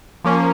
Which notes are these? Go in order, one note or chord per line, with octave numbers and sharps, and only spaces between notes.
F3 A#3 C#4